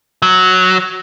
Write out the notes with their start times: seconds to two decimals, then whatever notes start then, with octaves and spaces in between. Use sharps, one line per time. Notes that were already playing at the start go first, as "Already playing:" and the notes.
0.22 F#3